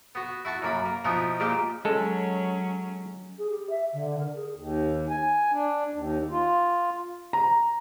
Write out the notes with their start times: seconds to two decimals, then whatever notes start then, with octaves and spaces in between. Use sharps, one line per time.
0.15 B3 F#4
0.45 E4 F#4 A5 C#6
0.62 F#2 A#3 B5
0.86 A#3
1.05 B2 F3 B3 D#4 E4
1.40 A#2 G#3 A#3 G4
1.85 F#3 G#3 C#4 A4
3.38 G#4
3.50 G4
3.70 E5
3.93 D3
4.19 A#4
4.35 G#4
4.55 D#2
5.10 G#5
5.52 D4
5.93 D#2
6.31 F4
7.33 A#5